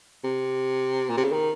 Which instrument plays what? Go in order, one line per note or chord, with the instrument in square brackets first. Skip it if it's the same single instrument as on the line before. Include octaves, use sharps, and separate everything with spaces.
[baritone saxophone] C3
A#2
C3
C#3
D#3